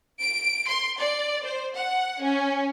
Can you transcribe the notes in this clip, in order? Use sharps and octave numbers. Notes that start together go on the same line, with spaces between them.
D7
C6
D5
C5
F#5
C#4